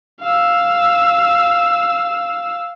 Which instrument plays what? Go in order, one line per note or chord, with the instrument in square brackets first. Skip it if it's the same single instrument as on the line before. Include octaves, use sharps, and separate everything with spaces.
[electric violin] F5 E6